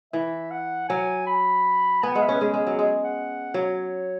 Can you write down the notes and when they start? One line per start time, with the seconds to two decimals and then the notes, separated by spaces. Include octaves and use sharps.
0.13 E3 E5
0.51 F#5
0.89 F#3 G#5
1.27 B5
2.03 B3 G#5
2.13 G#3 F#5
2.22 E5
2.29 C#4 B4
2.41 G#3 G#4
2.54 G#3
2.67 F#3
2.79 G#3 G#4
3.04 F#5
3.54 F#3 C#5